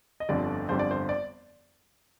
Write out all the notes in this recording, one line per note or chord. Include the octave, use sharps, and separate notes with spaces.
D#5
G1 F2 D3 G3 D5
G1 F2 D3 G3 C5
D5
C5
D5